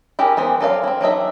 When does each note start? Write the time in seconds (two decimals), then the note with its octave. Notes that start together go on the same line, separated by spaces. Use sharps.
0.19 E4 G4 G#4 A#4
0.37 E3 B3 C5
0.61 F#3 A4 D5 F5
0.84 C4 E4
1.01 F#3 D4 D#4 E5